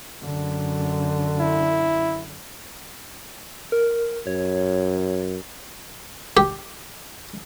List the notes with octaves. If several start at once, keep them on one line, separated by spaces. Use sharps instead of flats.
F#2 D3
E4
A#4
F#2 C#5
G4